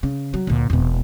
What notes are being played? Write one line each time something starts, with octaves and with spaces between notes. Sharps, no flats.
C#3
F#3
D2 A#2
E1 B2